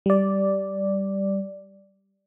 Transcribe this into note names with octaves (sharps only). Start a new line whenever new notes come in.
G3 D5